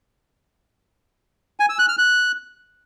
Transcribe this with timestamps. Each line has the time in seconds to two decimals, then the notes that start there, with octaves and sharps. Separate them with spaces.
1.60 G#5
1.69 E6
1.79 F#6
1.89 F6
1.98 F#6